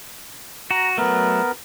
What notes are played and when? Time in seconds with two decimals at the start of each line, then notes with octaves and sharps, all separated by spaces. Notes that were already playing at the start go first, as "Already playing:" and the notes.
0.71 F#4 A#5
0.98 F#3 A3 B3 A#4